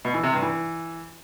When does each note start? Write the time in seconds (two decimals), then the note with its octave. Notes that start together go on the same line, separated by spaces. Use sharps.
0.05 B2
0.14 E3
0.24 C3
0.33 G2
0.42 E3